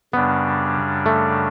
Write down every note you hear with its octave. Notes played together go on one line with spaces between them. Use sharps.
F#2 C#3 G3 B3 D4
A3